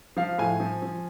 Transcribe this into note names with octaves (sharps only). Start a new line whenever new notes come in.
F3 F5
A2 G#5
F3
F3